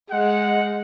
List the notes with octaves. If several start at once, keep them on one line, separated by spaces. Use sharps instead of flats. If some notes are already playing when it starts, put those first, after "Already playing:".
G#3 F#5